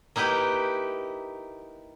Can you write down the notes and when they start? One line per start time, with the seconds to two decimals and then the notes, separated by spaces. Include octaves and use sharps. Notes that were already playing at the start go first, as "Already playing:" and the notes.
0.16 A#3 D#4 E4 G4 B4